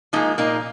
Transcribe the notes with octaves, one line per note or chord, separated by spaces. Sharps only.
F3 G#3 A#3 D#4
A#2 A#3 D#4